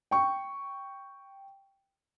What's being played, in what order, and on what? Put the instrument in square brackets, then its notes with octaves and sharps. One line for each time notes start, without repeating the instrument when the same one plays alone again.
[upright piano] G5 C#6